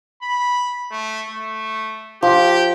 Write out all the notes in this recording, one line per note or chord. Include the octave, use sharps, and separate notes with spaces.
B5
A3
A3
F3 G4